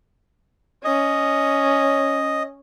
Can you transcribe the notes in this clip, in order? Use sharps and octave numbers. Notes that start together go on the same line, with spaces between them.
C#4 D#5